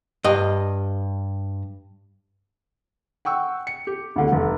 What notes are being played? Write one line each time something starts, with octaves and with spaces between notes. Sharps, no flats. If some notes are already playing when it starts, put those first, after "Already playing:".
G2 D#5
F#5 G5 C#6 E6
C#7
G4
D2 B2 D3
F1